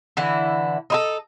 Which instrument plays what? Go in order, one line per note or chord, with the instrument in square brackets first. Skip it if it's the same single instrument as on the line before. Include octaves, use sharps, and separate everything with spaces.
[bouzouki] D3 E3 E4
D#4 E4 A4